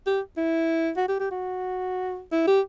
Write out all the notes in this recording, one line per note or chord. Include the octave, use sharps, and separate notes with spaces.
G4
E4
F#4
G4
G4
F#4
E4
G4